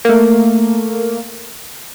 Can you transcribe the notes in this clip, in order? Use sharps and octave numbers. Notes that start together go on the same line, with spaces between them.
A3 A#3